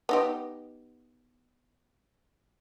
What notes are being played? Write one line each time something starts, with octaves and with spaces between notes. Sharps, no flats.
B3 D#4 G4